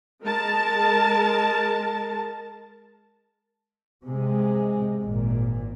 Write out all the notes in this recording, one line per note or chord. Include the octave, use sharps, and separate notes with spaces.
G#3 A#4 A5
C3 G#3
G#1 A#2